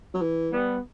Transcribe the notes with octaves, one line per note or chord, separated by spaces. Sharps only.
F#3
E3
G3 B3